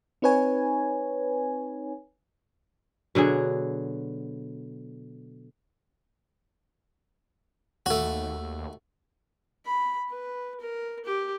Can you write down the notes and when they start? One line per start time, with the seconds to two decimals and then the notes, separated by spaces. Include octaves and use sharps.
0.22 C4 D#4 B4 C#5 G#5
3.15 B2 D3 F#3 G#4
7.86 D#2 A3 F#4
9.66 B5
10.09 B4
10.60 A#4
11.05 G4